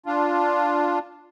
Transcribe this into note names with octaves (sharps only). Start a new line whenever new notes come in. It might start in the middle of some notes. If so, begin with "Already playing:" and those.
D4 F4